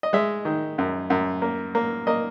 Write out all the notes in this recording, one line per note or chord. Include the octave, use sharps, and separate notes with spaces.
D#5
G#3 E5
D#3
F#2
F#2
A#3
A#3
A#3 D#5